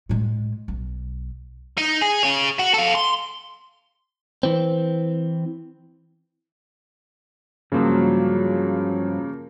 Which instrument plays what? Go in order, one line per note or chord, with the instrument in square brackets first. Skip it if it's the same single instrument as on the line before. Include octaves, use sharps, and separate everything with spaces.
[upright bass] A2 G#3
B1
[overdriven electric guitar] D#4
G#4
G#4 C#5
F#4
A4 F5
C6
[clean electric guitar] E3 C4
[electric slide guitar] G2 F3 F#3 [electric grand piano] C#3 A#3